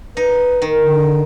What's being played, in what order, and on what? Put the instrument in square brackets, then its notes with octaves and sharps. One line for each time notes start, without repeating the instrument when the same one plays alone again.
[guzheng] D#4 [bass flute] B4
[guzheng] D#3
[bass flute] D3